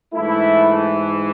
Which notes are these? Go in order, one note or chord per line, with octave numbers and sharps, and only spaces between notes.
G#2 E3 A3 E4